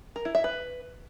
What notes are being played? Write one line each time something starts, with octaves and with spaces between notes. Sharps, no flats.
A#4
E4
E5
B4